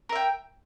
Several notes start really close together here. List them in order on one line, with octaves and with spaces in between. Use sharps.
A#4 E5 G5